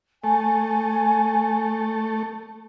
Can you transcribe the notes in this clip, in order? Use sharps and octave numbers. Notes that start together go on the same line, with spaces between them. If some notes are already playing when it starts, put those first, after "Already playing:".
A3 G#5